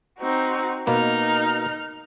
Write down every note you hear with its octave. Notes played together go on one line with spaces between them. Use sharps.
C4 D#4 F#4
B2 A#3 D#4 B4 F6